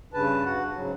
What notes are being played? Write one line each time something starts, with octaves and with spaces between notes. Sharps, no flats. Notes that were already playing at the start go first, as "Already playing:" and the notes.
G2 C#3 B4 A5
F#4 F#5
G#2 C#3 F#3